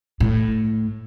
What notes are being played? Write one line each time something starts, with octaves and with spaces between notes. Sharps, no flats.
A2